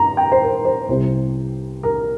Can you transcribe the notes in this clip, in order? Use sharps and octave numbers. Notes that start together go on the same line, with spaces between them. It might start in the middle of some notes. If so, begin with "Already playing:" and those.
Already playing: G2 A#5
G5
C5
A#4
C5
C2 C3 G3 C5
A#4